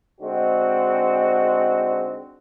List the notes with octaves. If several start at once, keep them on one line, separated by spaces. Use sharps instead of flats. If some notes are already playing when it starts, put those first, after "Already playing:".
D3 G#3 C4 D#4 F#4